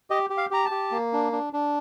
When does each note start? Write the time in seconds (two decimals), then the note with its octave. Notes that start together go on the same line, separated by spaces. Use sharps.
0.10 G4 D#5
0.30 G4
0.37 F5
0.51 G4 A#5
0.65 A5
0.71 G4
0.91 A#3
1.13 D4
1.32 D4
1.53 D4